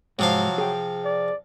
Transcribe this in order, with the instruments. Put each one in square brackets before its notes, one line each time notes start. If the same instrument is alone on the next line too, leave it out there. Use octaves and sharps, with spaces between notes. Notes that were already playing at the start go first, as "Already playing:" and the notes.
[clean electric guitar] G#2 [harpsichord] C3 F3 F5 [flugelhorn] F#3
[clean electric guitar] G#4 G5
[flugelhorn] D5